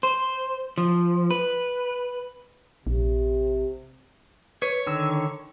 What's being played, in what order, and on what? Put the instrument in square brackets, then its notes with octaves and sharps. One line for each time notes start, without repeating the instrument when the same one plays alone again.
[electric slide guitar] C5
F3
B4
[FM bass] A#1 [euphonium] C3
[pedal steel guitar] B4 [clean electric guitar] C#5
[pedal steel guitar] D3 D#3 E6